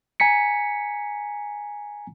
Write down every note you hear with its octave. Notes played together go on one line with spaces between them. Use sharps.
G#5 A#5 B6 C#7